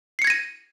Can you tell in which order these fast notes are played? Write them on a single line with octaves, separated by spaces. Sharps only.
C7 C#7 G#6 A#6 D#7